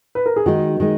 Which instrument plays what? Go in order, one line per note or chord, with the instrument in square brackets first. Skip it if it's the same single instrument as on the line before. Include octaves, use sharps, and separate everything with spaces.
[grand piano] B4
A#4
G#4
[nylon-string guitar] D#3 G#3 D#4 [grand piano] F#4
[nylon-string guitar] D#3 G#3 D#4